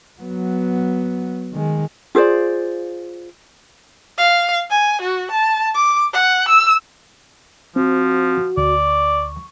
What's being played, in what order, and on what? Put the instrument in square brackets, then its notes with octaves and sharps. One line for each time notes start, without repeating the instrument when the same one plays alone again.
[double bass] F#3 B3
D#3 G#3
[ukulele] F4 G#4 C5 D5
[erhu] F5
G#5
F#4
A5
D6
F#5
E6
[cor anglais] F3 [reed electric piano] C4 [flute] F#4
[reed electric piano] D2 [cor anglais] D5
[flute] C#6